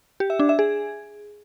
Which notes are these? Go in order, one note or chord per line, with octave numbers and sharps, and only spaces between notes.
G4
E5
D4
E5
G#4